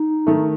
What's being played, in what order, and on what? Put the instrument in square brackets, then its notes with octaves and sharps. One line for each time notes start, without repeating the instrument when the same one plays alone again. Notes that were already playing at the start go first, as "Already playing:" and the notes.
Already playing: [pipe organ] D#4
[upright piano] D#3 A3